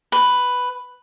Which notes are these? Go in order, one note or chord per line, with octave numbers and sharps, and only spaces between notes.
B4